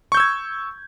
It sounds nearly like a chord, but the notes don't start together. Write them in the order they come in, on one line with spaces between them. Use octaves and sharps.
C#6 G6 E6 G#6